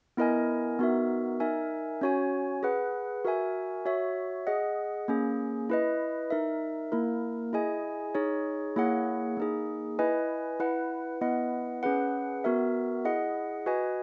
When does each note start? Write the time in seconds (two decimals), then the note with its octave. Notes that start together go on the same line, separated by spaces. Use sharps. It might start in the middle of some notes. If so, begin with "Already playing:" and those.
0.17 B3 E4 A#4 D#5 G#5
0.79 B3 D#4 F#4 A#4 E5
1.40 D#4 A#4 E5 G#5
2.01 C#4 F#4 C#5 G#5
2.63 G#4 B4 F#5
3.25 F#4 A#4 E5 G#5
3.86 F#4 C#5 E5
4.47 G#4 D#5 F#5
5.08 A#3 C#4 G#4
5.70 E4 B4 D#5
6.30 D#4 A#4 E5
6.92 A#3 E4 A#4
7.53 E4 G#4 D#5 G#5
8.15 D#4 G#4 C#5
8.76 A#3 E4 G#4 C#5 F#5
9.37 A#3 D#4 G#4
9.99 E4 B4 D#5 G#5
10.60 E4 B4 F#5
11.21 B3 E4 B4 D#5 F#5
11.83 C#4 G#4 B4 F#5
12.44 B3 F#4 A#4 E5
13.05 E4 G#4 D#5 F#5
13.66 F#4 B4 D#5 G#5